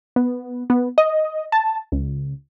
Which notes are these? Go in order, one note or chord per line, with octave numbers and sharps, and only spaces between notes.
B3
B3
D#5
A5
C#2